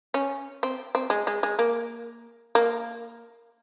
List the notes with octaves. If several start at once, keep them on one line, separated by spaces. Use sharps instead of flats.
C#4
C4
C4
G#3
G#3
G#3
A#3
A#3